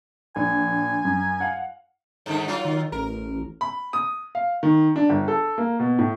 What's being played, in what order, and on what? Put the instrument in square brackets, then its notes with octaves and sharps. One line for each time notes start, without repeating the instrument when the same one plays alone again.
[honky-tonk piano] A#1 [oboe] G#5
[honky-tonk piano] F#2
F5 F#5
[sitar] G2 D3 D#3
F#3 F4
[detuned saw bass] D#3
[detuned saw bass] A1 [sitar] A#4
[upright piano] B5
D#6
F5
D#3
D4
G1
A4
A#3
B2
A2